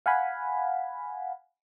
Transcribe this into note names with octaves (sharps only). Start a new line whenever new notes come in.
F5 F#5 G#5 B5